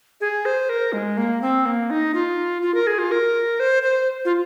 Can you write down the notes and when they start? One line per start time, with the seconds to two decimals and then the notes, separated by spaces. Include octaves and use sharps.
0.21 G#4
0.45 C5
0.69 A#4
0.93 G#3
1.17 A#3
1.42 C4
1.66 A#3
1.90 D#4
2.14 F4
2.62 F4
2.74 A#4
2.87 G#4
2.99 F4
3.11 A#4
3.60 C5
3.83 C5
4.25 F4